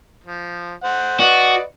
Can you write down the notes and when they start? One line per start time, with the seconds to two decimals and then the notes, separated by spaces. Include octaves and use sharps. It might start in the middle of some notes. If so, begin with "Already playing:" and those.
0.24 F3
0.84 C5 F#5
1.20 F#4 B4 D5 D#5